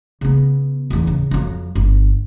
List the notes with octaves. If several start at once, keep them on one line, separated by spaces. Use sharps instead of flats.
C#3 B3
D1 E2
C#3
F2 F#3
G1